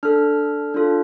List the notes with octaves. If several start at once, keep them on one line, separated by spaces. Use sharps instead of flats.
D4 A4 F6
D4 F4 A4